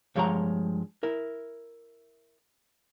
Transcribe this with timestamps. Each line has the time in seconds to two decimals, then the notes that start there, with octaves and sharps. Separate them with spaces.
0.15 G2 F3 G#3 C#5 F#5 A#5
1.03 E4 A#4